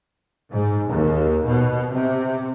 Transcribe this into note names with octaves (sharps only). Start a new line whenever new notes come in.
G#2
D#2
B2
C3